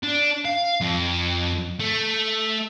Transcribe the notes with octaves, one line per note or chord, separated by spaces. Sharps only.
D4
F5
F2
A3